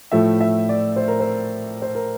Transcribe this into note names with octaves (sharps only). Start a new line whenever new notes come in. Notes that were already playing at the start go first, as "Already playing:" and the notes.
A2 F3 A3 E5
E5
D5
C5
A#4
C5
C5
A#4